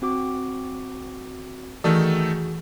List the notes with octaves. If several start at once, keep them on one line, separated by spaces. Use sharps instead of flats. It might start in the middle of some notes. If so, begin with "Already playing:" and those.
C4 F#4 D6
D#3 E3 A3 F#4 G#4 A4